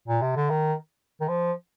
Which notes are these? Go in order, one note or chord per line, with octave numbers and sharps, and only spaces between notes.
A#2
C3
D3
D#3
D#3
F3